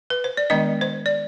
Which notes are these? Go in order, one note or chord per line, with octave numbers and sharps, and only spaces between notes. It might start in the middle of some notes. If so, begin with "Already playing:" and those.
B4
C5
D5
D#3 G#3 B3 D4 D#5
C5
D5